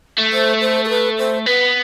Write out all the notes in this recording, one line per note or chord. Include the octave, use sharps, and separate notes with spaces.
A3
C5
C5
A4
B4
C5
B3 B4